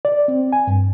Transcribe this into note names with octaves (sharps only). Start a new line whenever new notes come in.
D5
C4
G#5
G2